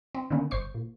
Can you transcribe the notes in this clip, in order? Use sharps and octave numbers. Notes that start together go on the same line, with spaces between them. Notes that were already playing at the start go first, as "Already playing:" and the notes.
C4
D3 D#3 A#3 B3 C#4
G1 C5 C#6 C7
A#2